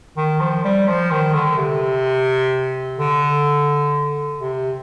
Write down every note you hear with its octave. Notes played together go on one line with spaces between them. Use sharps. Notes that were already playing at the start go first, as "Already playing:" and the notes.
D#3
F3
G3
F3
D#3
D3
C3
D3
C3